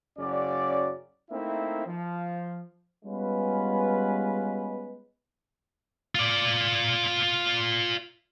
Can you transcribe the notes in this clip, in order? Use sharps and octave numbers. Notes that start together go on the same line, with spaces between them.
F#1 C#3 F#3 C#4 D5
A3 A#3 C4 D#4 E4 E5
F3
G3 G#3 B3 C#4 F4 B4
F4 D5